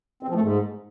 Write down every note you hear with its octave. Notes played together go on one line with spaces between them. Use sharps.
C4
F3
A3
G#2